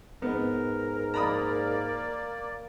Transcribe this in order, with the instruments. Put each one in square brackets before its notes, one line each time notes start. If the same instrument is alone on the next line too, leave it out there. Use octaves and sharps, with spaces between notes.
[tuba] G#2 [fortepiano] B3 [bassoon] A#4
[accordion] A#3 D5 [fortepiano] A#5 B5 D#6